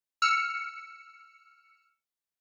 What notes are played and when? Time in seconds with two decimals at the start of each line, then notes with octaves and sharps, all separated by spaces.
0.22 E6 F6 C#7